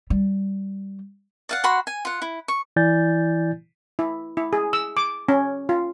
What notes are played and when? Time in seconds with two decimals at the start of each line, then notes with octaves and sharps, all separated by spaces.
0.10 G3
1.49 D5 F5 F#5
1.64 F#4 F#5 B5 C6
1.87 G#5
2.05 F4 F#5
2.22 E4
2.48 C#6
2.76 E3 E4 D5 G#5 G6 A6
3.99 E4
4.37 E4
4.53 G#4
4.73 E6
4.97 D6
5.29 C#4
5.69 F4